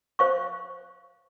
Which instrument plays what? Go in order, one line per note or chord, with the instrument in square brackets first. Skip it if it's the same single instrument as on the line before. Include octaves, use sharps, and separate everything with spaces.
[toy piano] C5 F5 C#6